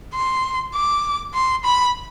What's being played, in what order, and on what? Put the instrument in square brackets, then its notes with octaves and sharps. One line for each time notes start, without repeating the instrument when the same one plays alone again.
[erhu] C6
D6
C6
B5